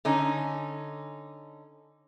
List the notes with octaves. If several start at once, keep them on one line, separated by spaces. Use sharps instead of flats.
D3 C#4 D#4